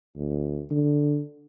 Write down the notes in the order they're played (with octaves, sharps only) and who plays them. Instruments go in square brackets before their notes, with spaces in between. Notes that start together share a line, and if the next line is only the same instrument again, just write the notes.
[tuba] D2
D3